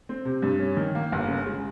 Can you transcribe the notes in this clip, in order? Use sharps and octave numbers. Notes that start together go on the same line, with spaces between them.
C4
C3
G2
C#4
D#3
A#3
G1
C#3
G#3